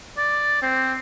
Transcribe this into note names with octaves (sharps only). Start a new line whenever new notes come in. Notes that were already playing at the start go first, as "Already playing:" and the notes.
D5
C4